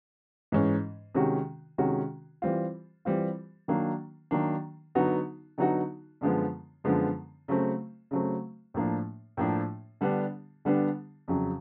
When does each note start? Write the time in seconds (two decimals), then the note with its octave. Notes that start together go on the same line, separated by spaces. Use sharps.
0.52 G#2 E3 G#3 C#4
1.15 C3 D#3 G#3 C#4 F#4
1.78 C3 D#3 G#3 C#4 F#4
2.42 E3 G3 C4 F4
3.05 E3 G3 C4 F4
3.68 D#3 F#3 A#3 D4
4.31 D#3 F#3 A#3 D4
4.95 D3 F#3 B3 D#4 F#4
5.58 D3 F#3 B3 D#4 F#4
6.21 F#2 D3 F3 G#3 B3
6.84 F#2 D3 F3 G#3 B3
7.48 C#3 F#3 A3 C4
8.11 C#3 F#3 A3 C4
8.74 A2 F3 A#3 D4
9.37 A2 F3 A#3 D4
10.01 D3 G3 B3 D4
10.65 D3 G3 B3 D4
11.28 F2 C#3 F#3